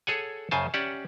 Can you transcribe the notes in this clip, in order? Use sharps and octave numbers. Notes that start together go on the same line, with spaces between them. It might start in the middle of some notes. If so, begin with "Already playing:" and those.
G#4 A4 C#5 F#5 G#5
F#2 C#3 C5 G#5 A5
C#4 G4 D5 E5 F#5